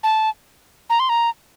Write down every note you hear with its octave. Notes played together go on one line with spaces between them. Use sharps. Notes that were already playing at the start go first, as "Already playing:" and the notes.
A5
A#5
C6
A#5